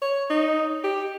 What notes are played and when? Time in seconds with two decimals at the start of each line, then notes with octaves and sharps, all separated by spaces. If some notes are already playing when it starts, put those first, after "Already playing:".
0.02 C#5
0.30 D#4
0.84 G4